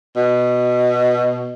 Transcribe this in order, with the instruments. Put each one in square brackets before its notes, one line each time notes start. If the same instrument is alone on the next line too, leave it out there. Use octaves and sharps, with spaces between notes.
[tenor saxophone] B2